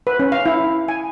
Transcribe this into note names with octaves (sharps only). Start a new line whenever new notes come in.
B4
C#4
F5
E4
G#5